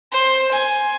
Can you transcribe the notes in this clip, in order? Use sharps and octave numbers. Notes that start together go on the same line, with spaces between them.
C5
G#5